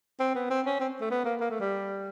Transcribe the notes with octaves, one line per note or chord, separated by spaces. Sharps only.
C4
B3
C4
C#4
C4
A3
B3
A#3
A#3
A3
G3